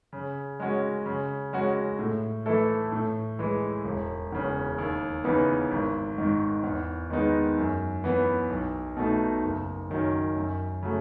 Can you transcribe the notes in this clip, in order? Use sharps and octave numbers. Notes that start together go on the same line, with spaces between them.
C#3
G#3 C#4 F#4
C#3
G#3 C#4 F#4
A2
E3 A3 E4 A4
A2
E3 G#3
E1
E2 C#3
D#2
C#3 E3 B3 D#4
G#1
G#2 D#3
E2
D#3 G#3 B3 D#4
F#2
E3 B3
B1
B2 A3 D#4
F#1
F#2 D#3 F#3 C#4
F#2
C#3 F#3 A3